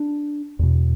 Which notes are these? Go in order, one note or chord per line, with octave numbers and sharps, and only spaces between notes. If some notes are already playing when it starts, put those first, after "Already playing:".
Already playing: D4
E2 B2